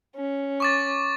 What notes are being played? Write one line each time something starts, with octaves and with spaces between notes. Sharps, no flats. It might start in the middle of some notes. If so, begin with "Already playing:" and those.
C#4
C#6 D6 A6